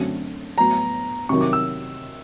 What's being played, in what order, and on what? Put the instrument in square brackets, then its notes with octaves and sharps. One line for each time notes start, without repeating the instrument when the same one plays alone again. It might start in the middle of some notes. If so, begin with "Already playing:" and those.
Already playing: [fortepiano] F#2 D3 F#3 A3 C4
[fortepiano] A2 F#3 B3 [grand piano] A#5
[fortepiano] C3 D#3 F#3 [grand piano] C#6
[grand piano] D6
E6